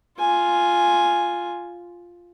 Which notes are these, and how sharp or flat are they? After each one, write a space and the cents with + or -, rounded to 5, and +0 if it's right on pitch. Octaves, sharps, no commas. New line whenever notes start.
F4 +0 G#5 +0